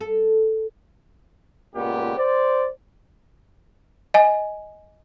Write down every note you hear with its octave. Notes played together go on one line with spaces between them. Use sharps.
A4
C#2 A#2 B3 G4
C5 D5
D#5 G#5